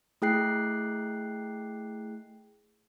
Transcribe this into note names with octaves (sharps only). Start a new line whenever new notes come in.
A3 E4 G#4 G5 F#6 C7